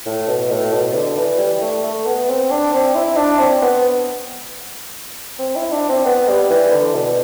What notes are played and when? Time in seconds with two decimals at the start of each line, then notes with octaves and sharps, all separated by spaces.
0.06 A2
0.28 B2
0.51 A2
0.73 B2
0.95 D3
1.17 E3
1.39 G3
1.62 A3
1.84 A3
2.07 B3
2.29 C4
2.51 D4
2.73 C4
2.95 E4
3.17 D4
3.39 C4
3.62 B3
5.39 C4
5.56 E4
5.72 D4
5.89 C4
6.06 B3
6.28 G3
6.50 E3
6.72 D3
6.94 B2